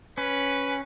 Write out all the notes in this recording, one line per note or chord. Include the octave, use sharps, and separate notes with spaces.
C#4 B4